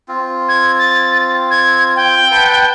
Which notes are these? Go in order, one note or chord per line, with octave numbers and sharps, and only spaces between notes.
C4 F4
G#6
A6
G#6
G5
B4 F#5 A5